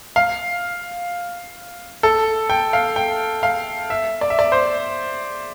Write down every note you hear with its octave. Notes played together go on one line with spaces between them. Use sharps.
F5
A4
G5
F5
G5
F5
E5
D5
E5
D5
C5